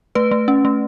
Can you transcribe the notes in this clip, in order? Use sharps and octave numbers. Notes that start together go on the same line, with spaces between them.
A3 B4
A3
C#4
A3